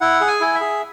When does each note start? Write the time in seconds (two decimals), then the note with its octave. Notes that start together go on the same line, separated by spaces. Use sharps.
0.01 E4 F#5
0.21 G#4
0.28 G#5
0.40 E4
0.55 E5
0.61 G#4